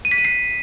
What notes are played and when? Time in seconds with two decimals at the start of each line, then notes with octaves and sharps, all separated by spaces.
0.05 D#7
0.11 B6
0.18 D#7
0.25 C7